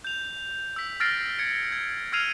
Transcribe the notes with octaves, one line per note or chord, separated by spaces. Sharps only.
G6 F7
E6 B6
E6 F6 A6 A#6 C7 D7
G#6 C#7 D7
G#6
E6 F6 G#6 C7 D#7 F7